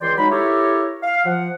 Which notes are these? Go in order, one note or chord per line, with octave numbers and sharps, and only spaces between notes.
C#2 E3 D5 G5 C6
F#3 G#3 D#4 A#4 B5
E4 G4 A4 A#4 C#5
F5
F3 F#5